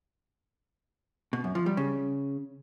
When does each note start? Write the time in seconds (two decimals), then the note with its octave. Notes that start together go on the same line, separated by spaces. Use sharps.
1.33 B2
1.44 F#2
1.55 F3
1.66 G3
1.77 C#3